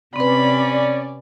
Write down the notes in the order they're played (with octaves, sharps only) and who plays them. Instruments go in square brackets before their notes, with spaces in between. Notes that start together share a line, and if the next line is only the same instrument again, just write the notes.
[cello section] C3 [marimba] C4 B4 [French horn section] C#4 D5 [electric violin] B5